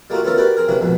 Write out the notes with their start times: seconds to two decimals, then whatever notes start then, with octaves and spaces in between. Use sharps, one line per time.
0.10 G3 A3 A#3 D#4 F4 F#4
0.24 A3 B3 C#4 F4 A4 A#4
0.38 F#4 G4 A#4 B4 D5
0.57 C4 G#4 A#4
0.68 C3 E3 F#3 A#3 C#4 F#4
0.81 A#1 F2 G#2 B2